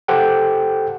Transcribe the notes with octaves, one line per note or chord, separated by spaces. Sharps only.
G4 A4 C5 F#5 G5